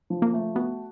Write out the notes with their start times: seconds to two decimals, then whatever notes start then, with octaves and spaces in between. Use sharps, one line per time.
0.10 F3
0.22 A#3
0.34 A3
0.55 B3 F#4